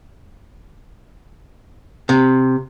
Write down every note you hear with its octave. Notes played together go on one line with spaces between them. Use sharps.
C3